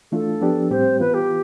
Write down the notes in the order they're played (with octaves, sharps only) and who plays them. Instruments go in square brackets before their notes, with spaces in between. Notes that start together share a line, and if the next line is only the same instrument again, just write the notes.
[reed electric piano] E3 A3 D4 F4 [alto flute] A4
[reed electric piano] F3 B3 D4 G4
[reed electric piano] A2 G3 C4 G4 [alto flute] C5
[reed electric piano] E3 B3 F4 [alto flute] B4
[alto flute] G4